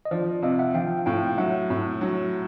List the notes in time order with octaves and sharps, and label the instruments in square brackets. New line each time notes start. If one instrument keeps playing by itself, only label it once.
[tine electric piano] D#5
[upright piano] F3 [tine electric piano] C5 D5
[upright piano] C3 [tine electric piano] D#5 F5
[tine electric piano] E5 F#5
[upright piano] F3 [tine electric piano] F5 G5
[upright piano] A2 [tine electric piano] F5 G5
[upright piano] F#3 [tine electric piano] E5 F#5
[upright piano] A2
F#3